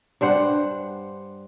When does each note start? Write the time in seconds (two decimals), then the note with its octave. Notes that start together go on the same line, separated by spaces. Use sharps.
0.21 G2 D4 C5 F#5